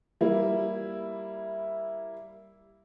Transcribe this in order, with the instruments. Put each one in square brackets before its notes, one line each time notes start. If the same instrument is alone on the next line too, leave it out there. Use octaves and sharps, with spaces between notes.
[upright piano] G3 A#3 E4